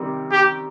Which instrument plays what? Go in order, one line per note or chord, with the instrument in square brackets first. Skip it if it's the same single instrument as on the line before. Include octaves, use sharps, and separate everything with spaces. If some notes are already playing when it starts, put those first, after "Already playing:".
Already playing: [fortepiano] C3 D#3 G3
[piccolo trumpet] G4